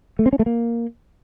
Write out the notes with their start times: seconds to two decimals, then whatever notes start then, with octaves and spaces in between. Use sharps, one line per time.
0.19 A3
0.26 C4
0.33 C#4
0.39 A3
0.46 A#3